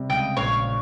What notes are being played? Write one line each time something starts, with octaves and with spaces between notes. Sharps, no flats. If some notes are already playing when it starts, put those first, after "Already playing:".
Already playing: C3 G3
C#2 D#5 G5
A#1 C#5 F5